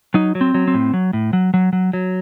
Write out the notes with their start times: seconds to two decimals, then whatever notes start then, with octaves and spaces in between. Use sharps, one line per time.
0.14 F#3 D#4
0.35 F#3
0.41 C4
0.54 F#3
0.68 C4
0.74 A2
0.94 F#3
1.13 A2
1.33 F#3
1.54 F#3
1.73 F#3
1.93 F#3